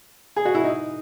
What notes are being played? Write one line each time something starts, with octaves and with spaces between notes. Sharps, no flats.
G#4
F#4
E4
D#4